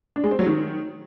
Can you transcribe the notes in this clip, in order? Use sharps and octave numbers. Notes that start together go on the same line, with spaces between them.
D4
G#3
C4
F#3
D#3